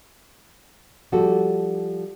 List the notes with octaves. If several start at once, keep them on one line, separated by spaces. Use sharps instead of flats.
F3 G3 F#4 G4 A4